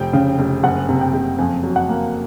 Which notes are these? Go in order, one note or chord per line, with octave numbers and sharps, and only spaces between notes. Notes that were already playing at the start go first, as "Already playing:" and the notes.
Already playing: F1 G5
C#3
F1
F#1 F#5
C3
G5
F#1
F2 G#5
F#3
F#5
A#3